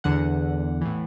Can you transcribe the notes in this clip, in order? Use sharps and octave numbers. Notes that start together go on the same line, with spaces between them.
E2 D3 F#5
A2 E3